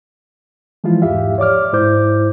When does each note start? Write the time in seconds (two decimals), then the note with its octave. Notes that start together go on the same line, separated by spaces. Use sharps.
0.84 E3 F3 G#3 E4 F4
1.02 E2 G#2 G4 E5 F5
1.38 C#5 D5 D6 F6
1.73 G#2 E4 C5 D6 G6